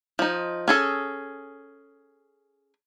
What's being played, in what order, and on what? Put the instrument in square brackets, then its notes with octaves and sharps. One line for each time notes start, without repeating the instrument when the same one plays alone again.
[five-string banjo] F3 D#4
C#4 G#4 A4